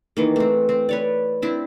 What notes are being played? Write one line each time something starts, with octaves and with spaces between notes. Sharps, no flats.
D#3 E3 A#3
A3 C4
C4
B4 C#5 D5
C4 D4 E4 A5